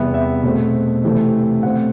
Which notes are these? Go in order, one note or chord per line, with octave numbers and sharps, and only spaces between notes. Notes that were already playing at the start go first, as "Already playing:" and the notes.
Already playing: E2 C3 G3 B3 E5
E5
B2 A3 C4
C3 E3 A3 C4
B2 A3 C4 F#5